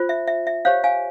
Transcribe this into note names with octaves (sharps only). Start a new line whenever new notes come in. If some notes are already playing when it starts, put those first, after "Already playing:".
Already playing: F4 C5
E5
E5
E5
G4 C5 C#5 F5
F5 G#5